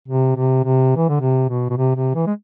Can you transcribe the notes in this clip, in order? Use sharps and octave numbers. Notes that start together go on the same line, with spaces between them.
C3
C3
C3
E3
D3
C3
B2
B2
C3
C3
E3
G#3